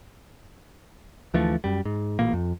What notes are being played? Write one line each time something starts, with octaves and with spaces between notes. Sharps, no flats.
D2 E3 F3 A3
F#2 G3
G#2
A1 A#2 A#3
F2